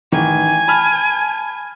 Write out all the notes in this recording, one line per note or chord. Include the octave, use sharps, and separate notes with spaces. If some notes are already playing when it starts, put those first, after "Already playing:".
A1 D#3 E3 G#5
A5 B5 F6